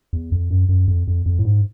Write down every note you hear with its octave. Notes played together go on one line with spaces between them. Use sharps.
E2
F2
F#2
F#2
F2
F2
F2
A2
G#2